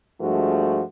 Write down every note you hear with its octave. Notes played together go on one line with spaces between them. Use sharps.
G2 F3 G#3 A3 F#4